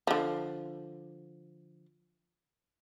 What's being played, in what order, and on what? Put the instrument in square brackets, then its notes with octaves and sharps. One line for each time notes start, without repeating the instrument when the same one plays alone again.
[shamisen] D3 F3